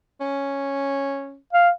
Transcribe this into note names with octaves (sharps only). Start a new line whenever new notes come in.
C#4
F5